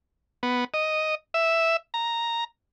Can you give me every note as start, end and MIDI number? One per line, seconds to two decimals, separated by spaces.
0.43 0.64 59
0.74 1.15 75
1.34 1.77 76
1.94 2.44 82